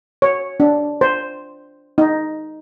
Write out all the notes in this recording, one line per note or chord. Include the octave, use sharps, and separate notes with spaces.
C#5
D4
C5
D#4